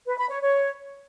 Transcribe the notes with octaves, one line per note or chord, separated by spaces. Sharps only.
B4
B5
C#5
C#5